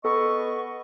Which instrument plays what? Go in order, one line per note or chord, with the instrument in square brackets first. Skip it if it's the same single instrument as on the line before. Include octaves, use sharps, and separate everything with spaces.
[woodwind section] B3 D#5 C#6 [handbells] A4